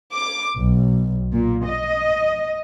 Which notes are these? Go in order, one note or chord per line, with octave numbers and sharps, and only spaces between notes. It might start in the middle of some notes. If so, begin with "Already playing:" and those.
D6
B1
A#2
D#5